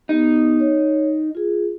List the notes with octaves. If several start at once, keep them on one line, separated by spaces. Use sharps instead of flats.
B3 D#4 G4
C#5
F4 G#4